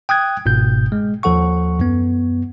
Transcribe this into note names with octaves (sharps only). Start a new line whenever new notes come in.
G5 D#6 F#6 G#6
G1 G#2 B2 G6
G#3
D#2 F3 A4 F#5 C#6
F#2 B3